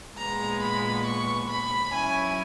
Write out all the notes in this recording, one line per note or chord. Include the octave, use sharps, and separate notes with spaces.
A#2 G#3 B3 A#5
B5
C#6
B5
F#3 C#4 E4 G#5